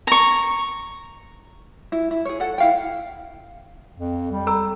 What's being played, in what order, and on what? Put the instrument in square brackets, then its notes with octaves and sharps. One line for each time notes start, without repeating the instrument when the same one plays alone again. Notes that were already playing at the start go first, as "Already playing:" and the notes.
[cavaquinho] A#5 C#6
[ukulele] E4
E4
G#4 C#5
A4 F#5
E4 F5 G5
[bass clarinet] F2
G3
[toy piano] A4 A#5 E6